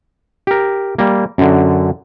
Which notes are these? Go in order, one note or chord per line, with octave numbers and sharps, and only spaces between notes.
G4 A#4
G3 A#3
F#2 D3